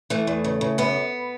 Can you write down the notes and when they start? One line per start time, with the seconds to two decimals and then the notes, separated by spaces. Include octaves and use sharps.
0.10 E3 A3
0.27 E2
0.44 C#3
0.61 C#3
0.78 F#2 B3